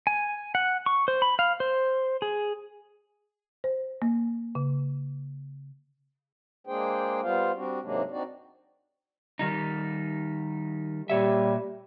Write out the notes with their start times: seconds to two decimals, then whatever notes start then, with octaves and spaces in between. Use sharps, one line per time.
0.07 G#5
0.55 F#5
0.86 C#6
1.08 C5
1.22 B5
1.39 F5
1.60 C5
2.22 G#4
3.64 C5
4.02 A#3
4.55 C#3
6.67 G#3 A#3 D4 G#4 C5 G5
7.22 G3 B3 F4 C5 F5
7.56 G3 C4 D4 F#4
7.83 G#2 C3 F#3 G#3 A#3 D4
8.11 C4 D4 D#4 F#4 D5
9.39 D#3 G3 D#4
11.10 A#2 G3 C#5 E5